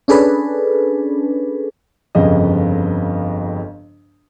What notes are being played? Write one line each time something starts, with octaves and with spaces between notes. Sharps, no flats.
C#4 D4 G#4 A4 B4
G1 F2 C#3 D#5